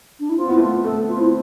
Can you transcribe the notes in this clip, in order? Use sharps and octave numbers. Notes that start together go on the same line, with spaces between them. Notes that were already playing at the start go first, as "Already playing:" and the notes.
D4
E4
C4 F4
B3 E4
A3 F4
B3
A3 A4
B3
F4
C4 E4